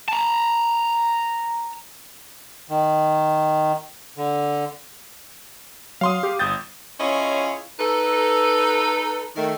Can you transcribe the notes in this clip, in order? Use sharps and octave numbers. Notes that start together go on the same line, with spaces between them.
A5 A#5
D#3
D3
F#3 F5 C6 D#6
G4
G1 D#6 G6 A6
C#4 E4 F4 G#4 C#5 D#5
D#4 A4 B4
D#3 A3